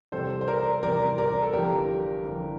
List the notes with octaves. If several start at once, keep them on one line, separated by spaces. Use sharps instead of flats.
E2 C3 G3 A4 C5
C5
A#4 D5
E2 C3 G3 A#4 D5
A#4 D5
A4
G1 F2 E3 G3 G4 A#4
G1 F2 E3 G3